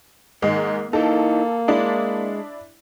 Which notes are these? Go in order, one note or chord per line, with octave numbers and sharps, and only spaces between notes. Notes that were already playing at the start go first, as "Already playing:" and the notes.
G#2 D#3 G#3 A#3
E3 A#3 D#4 A4
G#3 D4 E4 D5